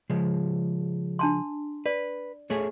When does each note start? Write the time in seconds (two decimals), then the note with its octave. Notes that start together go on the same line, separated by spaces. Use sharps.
0.10 C#3 F3 G#3
1.19 D4 A5 C6
1.86 B4 D5
2.50 A3 G#4 C#5